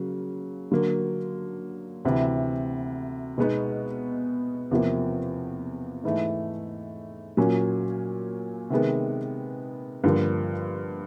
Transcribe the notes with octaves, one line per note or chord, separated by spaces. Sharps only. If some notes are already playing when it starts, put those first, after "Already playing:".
Already playing: C#3 F#3 A#3
D3 F#3 A#3
D2 C3 E3
B2 G#3 B3 D#4
E2 C3 F3 A#3
G#2 E3 A3
A#2 F#3 A#3 C#4
C3 D#3 G#3 B3
G2 D3 F3 A#3